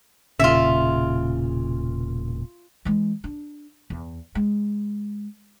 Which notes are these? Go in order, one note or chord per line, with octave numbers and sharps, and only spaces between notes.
E1 A#2 C#3 F4 E5
E3 G#3
D4
E2
G#3